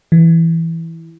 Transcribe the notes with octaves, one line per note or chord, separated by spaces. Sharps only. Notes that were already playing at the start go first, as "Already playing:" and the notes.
E3